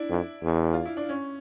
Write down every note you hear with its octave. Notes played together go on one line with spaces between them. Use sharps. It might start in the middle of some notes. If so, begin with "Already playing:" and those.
Already playing: D4 E4
F2
E2
F4
E4
D4
C#4